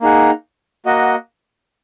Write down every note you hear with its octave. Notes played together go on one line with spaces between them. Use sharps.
A#3 D#4 G#4 F#5
A#3 F#4 D#5 F#5